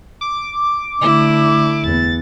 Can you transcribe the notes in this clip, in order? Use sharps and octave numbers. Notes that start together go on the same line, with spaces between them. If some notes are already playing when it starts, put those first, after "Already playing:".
D6
D3 A3 E4
E2 B3 A6